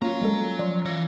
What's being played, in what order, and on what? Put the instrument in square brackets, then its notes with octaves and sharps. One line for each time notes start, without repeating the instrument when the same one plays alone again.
[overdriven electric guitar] F#3 A#5 [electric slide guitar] A#3 F#4 [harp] C#4 F4
[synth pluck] G3 G#3 A4
[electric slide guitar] F3 [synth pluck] D5 C6
[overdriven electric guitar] E3 [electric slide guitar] C#5 F5